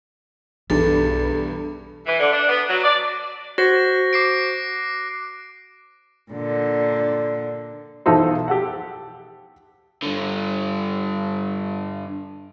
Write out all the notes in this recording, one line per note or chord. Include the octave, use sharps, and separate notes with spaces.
B1 E2 G2 A4
E3
D3
D4
B3
F#3
D5
F#4 C5 F#6 A#6
D6 C7 D7
A#2 D3
B1 E3 F3 D#4 A4 C5
G4 A4 F#5
G2 D3